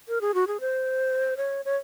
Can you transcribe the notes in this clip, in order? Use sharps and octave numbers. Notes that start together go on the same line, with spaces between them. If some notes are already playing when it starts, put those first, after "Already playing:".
A#4
G#4
F#4
G#4
C5
C#5
C#5